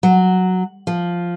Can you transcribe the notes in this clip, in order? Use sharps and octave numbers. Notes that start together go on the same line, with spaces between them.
F#3
F3